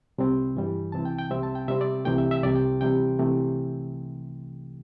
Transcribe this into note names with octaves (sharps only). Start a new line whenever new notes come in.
C2 C3 G3 C4
G2 E3 G3
C2 C3 E3 C4 A5
G5
G5
C2 C3 G3 C4 E5
A5
G5
C3 G3 C4 E5
D5
C2 C3 E3 A3 G5
E5
E5
C2 C3 G3 D5
G5
D2 C3 E3 G3 G5
C2 C3 E3 A3